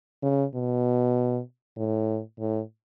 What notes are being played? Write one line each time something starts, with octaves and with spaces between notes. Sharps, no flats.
C#3
B2
A2
A2